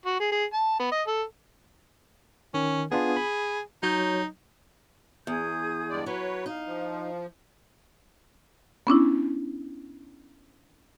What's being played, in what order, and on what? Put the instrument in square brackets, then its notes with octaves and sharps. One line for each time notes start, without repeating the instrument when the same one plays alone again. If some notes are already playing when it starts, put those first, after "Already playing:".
[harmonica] F#4
G#4
G#4
A5
B3
D#5
A4
[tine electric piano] D#3 [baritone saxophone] C#4
[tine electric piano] B3 D4 F4 [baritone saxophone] G#4
[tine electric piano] B5
[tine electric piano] F#3 C#5 G6 [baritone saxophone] D#4
[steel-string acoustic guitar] E2 [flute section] G#4 D#6 G6
[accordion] G2 G#3 D5
[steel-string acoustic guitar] F#3 [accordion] B4 C#5
[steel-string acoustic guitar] D#4 [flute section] F5
[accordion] F3
[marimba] B3 C#4 D4 E4